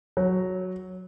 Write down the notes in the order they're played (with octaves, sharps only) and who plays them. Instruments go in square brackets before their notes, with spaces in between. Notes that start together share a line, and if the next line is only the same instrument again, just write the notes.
[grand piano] F#3